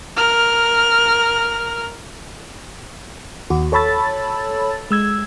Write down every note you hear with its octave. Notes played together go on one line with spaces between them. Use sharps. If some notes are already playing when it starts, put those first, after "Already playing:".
A#4 F6
D#2 F#4
A4 C#5 A5 B5 E6 A6
G#3 E6 G#6